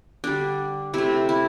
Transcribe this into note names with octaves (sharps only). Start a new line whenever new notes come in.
D3 G3 D4
C3 A3 E4
E4